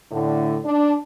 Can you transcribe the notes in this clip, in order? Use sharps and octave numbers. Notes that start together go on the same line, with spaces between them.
A2 D3
D4